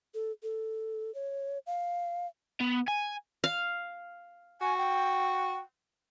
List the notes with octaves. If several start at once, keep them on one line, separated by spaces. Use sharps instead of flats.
A4
A4
C#5
F5
B3
G#5
F5
F#4 G#5
G5